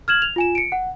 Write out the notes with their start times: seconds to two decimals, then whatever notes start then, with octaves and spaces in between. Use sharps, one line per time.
0.08 F6 G#6 E7 F#7
0.22 F7
0.36 F4 G#5 E7
0.55 C#7 D7
0.72 F#5